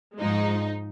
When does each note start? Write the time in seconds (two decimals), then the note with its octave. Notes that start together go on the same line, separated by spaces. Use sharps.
0.18 G#2 F3 G#3 D#4